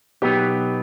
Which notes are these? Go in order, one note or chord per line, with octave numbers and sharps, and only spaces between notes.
B2 F#3 B3 D#4 G4